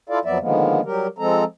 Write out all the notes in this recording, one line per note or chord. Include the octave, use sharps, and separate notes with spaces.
E4 F4 A4 D5 F5
F2 F3 F#3 B3 D5 E5
D3 D#3 F3 G#3 A#3 B3
F#3 G3 G4 A#4
F3 G#3 C4 A4 A#5